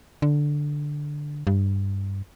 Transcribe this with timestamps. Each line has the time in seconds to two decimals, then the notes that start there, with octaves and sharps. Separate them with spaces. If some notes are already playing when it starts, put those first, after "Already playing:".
0.22 D3
1.47 G2